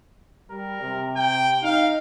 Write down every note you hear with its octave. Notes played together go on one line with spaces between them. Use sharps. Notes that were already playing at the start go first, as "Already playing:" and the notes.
G3 A#4
C3
G5
D#4 F5